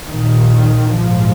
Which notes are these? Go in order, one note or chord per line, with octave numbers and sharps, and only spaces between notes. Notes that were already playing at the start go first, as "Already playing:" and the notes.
A#1 A#2 D#3
A#1 G#2 F3